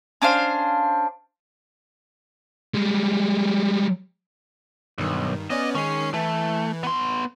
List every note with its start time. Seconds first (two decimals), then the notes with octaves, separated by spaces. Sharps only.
0.22 C#4 D4 C5 F5
2.74 G3 G#3
4.98 B1 G2 D#3
5.50 B3 C#4 D5 D#5
5.75 D#3 G#3 C#4 C7
6.14 E3 A3
6.83 B3 C6